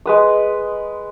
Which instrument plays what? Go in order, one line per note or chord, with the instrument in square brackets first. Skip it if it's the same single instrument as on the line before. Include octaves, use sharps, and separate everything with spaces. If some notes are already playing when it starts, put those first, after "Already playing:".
[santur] G#3 B4 D#6